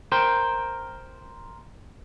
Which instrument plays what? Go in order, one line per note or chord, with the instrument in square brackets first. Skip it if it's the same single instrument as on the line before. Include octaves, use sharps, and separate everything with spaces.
[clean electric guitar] A#4 C5 G5